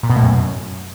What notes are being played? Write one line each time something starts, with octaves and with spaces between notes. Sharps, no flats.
A#2
B2
A2
F#2